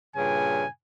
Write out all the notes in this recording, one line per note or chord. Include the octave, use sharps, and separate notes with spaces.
G2 A#2 C#3 G#5